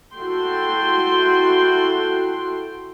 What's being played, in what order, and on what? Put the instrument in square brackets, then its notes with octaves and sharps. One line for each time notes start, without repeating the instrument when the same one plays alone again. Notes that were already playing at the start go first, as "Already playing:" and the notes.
[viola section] E4 F#4 A4 G5 C6